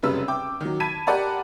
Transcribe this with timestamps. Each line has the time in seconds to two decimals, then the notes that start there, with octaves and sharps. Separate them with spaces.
0.03 F1 F#2 C#3 G3 B4 E6
0.28 G5 D6
0.61 D#3 F#3
0.80 A5 B5 G#6 B6 D#7
1.07 G4 A#4 D5 F#5 A5 B5